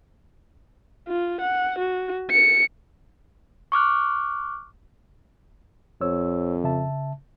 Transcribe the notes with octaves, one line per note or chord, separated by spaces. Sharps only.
F4
F#5
F#4
C#7
C#6 D6 F6 F#6
F2 C5 C#5 E6
C#3 E5 A5